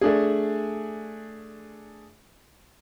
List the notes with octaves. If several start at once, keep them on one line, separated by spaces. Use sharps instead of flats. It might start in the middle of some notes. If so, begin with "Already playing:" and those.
A3 D4 G#4